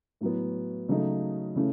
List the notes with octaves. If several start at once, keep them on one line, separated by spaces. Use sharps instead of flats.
A2 F#3 B3
C#3 F#3 A3 D#4
C#3 E3 A3 C#4